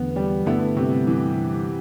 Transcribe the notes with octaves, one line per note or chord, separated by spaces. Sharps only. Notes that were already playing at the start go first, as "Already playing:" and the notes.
Already playing: E2 D3 A3 B3
G3
G2 D3 A3 B3 E4
C3
E3